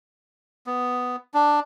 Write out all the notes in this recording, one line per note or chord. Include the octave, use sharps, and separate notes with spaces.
B3
D4